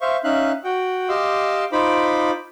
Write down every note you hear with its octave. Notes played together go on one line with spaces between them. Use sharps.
C5 E5 F5 C#6
C#4 D#4 E5 F5 F#6
F#4 F#5 G5
G4 D#5 F5 C6 D6 E6
D#4 F4 C5 B5 D6